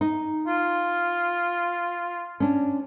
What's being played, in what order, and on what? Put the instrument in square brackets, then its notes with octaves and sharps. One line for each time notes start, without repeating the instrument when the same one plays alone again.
[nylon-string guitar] D#4
[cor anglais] F4
[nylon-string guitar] C#4 D4